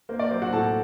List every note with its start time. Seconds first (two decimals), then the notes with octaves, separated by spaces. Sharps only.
0.09 A#3 C5
0.19 D5
0.31 F#3 C5
0.42 F#4 F#5
0.53 A2 A4 A5